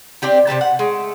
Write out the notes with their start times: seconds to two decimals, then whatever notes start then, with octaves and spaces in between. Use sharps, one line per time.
0.22 C4 D4 G4 G5
0.47 C3 F3 G4 A5
0.61 F#5
0.79 G#3 A3